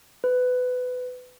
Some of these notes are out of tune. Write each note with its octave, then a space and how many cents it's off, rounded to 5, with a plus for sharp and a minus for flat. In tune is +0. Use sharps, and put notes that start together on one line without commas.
B4 +25